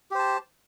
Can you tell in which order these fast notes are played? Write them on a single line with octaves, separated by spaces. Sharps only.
G4 C5 A5